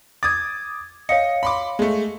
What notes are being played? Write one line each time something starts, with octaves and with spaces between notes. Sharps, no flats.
D6 D#6 G#6 A6
C#5 D#5 F5 C#7
B5 C6 D6
G#3 A3